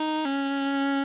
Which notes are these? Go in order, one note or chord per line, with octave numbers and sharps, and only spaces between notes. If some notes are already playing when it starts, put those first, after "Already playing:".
Already playing: D#4
C#4